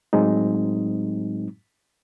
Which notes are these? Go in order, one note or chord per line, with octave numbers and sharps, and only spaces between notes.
A2 F#3 G#3 C4 D#4